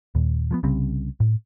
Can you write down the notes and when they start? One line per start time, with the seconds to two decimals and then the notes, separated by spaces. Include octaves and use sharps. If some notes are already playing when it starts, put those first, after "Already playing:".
0.15 D#2 A#2
0.51 F3 G#3 B3
0.63 C2 C#3 G3 C4
1.20 A2